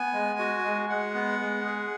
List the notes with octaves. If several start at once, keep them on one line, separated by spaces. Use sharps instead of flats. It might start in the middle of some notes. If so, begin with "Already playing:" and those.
Already playing: B3 G#5
G#3
F#4
G#3
G#3 F#5
B3
G#3
G#4